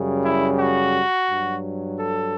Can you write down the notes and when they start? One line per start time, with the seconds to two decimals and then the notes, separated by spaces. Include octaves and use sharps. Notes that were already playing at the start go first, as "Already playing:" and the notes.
Already playing: F#2 C#3 G3
0.23 E4
0.58 F#4
1.29 G2 F#3
1.99 A4